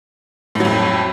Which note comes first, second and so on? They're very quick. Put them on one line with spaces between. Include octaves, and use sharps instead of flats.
A2 F#3 F2